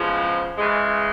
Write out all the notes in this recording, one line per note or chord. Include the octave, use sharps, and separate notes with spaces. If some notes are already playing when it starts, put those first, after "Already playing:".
Already playing: E2 C#3 F3 G#3
C#3 E3 G#3